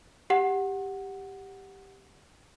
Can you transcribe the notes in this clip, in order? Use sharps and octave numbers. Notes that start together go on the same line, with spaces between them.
G4 F#5